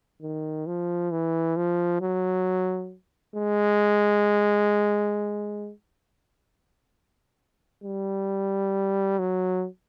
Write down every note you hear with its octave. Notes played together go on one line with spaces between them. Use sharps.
D#3
F3
E3
F3
F#3
G#3
G3
F#3